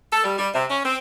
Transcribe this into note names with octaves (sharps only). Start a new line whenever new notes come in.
A4
G3
G3
C3
C#4
C4